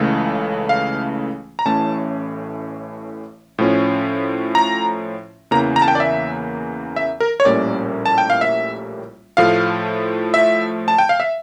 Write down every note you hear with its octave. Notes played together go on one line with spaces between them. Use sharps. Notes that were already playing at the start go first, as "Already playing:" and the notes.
Already playing: C#2 C#3 E3 A3
F5
A#5
A1 A2 E3 A3 C#4 A5
A2 F3 C#4
A#5
E2 C#3 E3 A#3 A#5
A#5
A5
G5
D5
E5
E5
A#4
C#5
A#1 A2 G3 A#3 C#4 D5
A5
G5
F5
E5
A2 F3 A3 F5
E5
A5
G5
F5
E5